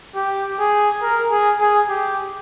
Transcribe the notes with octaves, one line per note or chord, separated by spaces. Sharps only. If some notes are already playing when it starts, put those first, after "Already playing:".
G4
G#4
A#4
G#4
G#4
G4